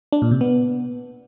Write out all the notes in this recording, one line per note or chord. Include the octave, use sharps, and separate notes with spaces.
D4
A#2
C3
B3